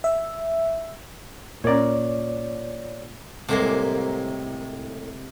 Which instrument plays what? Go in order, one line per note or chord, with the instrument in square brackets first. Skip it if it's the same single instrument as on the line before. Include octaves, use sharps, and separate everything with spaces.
[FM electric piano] E5
[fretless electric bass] A#2 [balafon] C#4 A#4 [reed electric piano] C#5 D5
[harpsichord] C2 A2 D6 [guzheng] C3 G#3 A#3